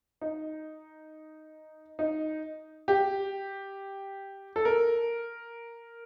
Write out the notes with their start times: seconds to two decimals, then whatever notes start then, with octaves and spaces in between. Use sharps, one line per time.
0.21 D#4
1.99 D#4
2.88 G4
4.56 A4
4.65 A#4